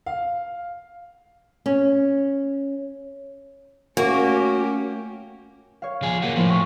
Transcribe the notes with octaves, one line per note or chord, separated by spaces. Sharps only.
F5
C#4
A3 A#3 C#4 F#4 G4
C#5 F5
F3 G#4
A#3 F#4
A2 F3 A#3 E4
G#5 C#6 B6